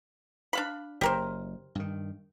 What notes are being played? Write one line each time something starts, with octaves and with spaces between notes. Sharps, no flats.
D4 F5 B5
F#1 G4 A#4 C5
G2 D#3